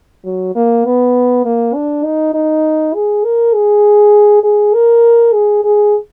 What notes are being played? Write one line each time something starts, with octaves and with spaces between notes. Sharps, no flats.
F#3
A#3
B3
A#3
D4
D#4
D#4
G#4
A#4
G#4
G#4
A#4
G#4
G#4